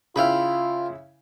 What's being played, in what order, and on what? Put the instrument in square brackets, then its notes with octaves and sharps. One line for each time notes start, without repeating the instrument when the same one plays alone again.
[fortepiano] C#3 E4 [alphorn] F4 [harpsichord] F5 G5 B5